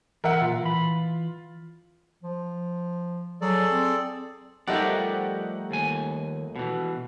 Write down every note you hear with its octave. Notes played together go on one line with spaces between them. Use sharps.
E3 A#4 E5 F#5
A#2 F4
E3 B5
F3
F#3 G#4 A4 D5
C4
F3 G3 A3 D#4 G4 A#4 D5 F#5
D#2 G#5
B2 E3